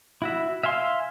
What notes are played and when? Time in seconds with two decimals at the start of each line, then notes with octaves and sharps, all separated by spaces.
0.22 E4 F#4 E5
0.63 E5 F5 G#5 C6